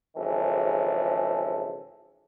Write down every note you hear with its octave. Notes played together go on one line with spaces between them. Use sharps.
G#1 C#3 E3 F3 A4